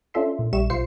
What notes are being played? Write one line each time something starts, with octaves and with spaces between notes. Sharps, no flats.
C#4 D4 F4 A4 E5 C6
A#2
A#1 G3 E5 C#6 E7
B1 F4 C5 C7 C#7